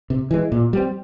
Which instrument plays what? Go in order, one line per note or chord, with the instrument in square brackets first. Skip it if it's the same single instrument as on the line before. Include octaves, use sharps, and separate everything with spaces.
[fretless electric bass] C3
E3 G#3
A#2
G3 C4